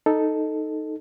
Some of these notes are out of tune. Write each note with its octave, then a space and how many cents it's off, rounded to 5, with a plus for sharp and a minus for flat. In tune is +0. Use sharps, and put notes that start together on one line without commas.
D#4 +0 A4 +0